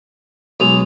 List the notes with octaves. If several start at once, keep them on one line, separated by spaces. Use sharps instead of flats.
B1 G#3 F7